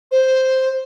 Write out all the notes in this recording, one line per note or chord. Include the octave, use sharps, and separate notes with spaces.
C5